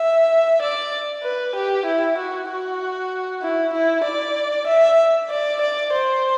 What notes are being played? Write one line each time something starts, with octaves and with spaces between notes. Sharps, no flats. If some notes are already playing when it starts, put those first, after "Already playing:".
Already playing: E5
D5
B4
G4
E4
F#4
F#4
E4
E4
D5
E5
D5
D5
C5